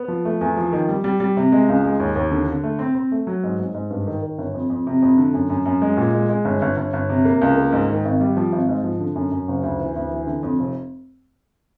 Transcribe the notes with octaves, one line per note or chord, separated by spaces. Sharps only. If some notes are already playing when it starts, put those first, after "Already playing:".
Already playing: B3
F3
A3
E2
F3
D#3
G3
G3
G3
C3
G#3
C#2
G#3
D#2
D#2
D3
D3
A3
C4
C4
A3
F#3
G#2
G#2
G#2
G2
D#3
D#3
G1
F2
F2
C3
F2
D3
F#2
F#2
F#2
G#3
A#2
G#3
G#3
G1
G1
G1
G1
C3
A#3
C#2
A#3
G#2
D#3
G#1
G3
F3
G#1
G#2
F3
D3
F#2
F#2
F#1
D2
E3
D2
E3
D3
F2
F1